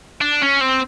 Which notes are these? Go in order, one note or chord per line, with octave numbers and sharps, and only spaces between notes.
D4
C#4
C4